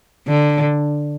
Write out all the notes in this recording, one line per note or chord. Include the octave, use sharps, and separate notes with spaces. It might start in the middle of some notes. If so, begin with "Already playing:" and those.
D3